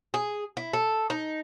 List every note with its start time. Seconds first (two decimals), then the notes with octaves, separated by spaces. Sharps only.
0.14 G#4
0.57 E4
0.73 A4
1.10 D#4